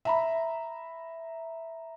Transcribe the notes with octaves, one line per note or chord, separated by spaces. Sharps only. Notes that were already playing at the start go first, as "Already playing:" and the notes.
E5 A#5 B5